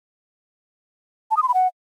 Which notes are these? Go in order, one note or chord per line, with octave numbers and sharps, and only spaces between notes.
A5
D#6
C6
B5
F#5